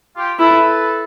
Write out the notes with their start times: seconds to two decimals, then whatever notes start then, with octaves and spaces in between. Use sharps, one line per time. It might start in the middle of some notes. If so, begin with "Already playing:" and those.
0.15 F4 G4
0.39 E4 A4 B4